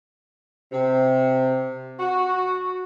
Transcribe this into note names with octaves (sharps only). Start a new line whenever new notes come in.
C3
F#4